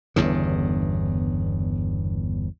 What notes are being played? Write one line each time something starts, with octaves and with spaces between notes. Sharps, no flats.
G1 E2 G2 C#3